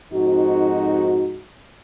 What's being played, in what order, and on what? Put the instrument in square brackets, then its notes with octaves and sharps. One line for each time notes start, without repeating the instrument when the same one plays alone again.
[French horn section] F2 G#2 D#4 F#4